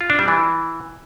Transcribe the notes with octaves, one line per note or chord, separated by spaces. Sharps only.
F4
D4
G3
E3